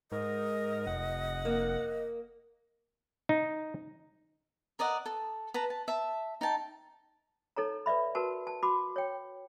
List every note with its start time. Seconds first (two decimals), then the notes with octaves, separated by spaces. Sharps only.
0.12 G#2 A#4 D#5
0.87 F1 F#5
1.45 A#3
3.29 D#4
4.79 A#4 D5 D#5 F#5
5.06 A4
5.54 B4 A5 A#5
5.70 A5
5.88 E5 A5
6.41 D#4 G5 A5
7.57 D#4 A4 C#5 A#5
7.86 B4 D5 E5 B5
8.15 F#4 A#4 B4 A5 C#6
8.47 A5
8.63 F#4 B5 D6
8.96 C#5 G5